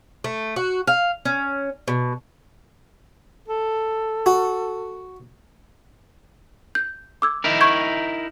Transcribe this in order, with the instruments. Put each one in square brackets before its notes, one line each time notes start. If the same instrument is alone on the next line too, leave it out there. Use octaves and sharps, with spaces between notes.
[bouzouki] A3
F#4
F5
C#4
B2
[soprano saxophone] A4
[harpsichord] F#4
[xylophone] G6
D6 E6 G#6
[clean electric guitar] D#4 E4 A#4
[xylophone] C#6 G6 G#6